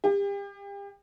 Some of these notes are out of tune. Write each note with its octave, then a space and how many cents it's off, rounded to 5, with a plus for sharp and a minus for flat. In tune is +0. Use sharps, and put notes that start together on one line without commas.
G4 +35